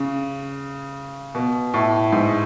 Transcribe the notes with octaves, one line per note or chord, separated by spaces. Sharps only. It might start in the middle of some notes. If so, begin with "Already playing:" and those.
Already playing: C#3
B2
A2
G#2